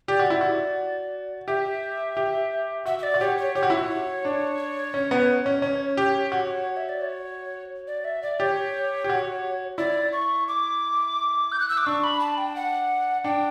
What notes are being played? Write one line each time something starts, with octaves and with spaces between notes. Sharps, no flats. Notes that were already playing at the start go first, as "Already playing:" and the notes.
G4 D5
F#4
E4
F#4
G4 E5
G4
F#4 E5
E5
D5
F#4
G4 C#5
C#5
G4 C#5
F#4
E4
F#4
D4
C#4
B3
C#4
C#4 C#5
G4
F#4
E5
D5
C#5
D5
E5
D5
G4 C#5
G4
F#4
E4 D5
C#6
D6
G6
F#6
E6
D6
D4 C#6
B5
A5
G5
F#5
D4 G5